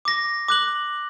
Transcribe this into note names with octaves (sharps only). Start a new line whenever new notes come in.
D6 A#6
D6 F#6 F#7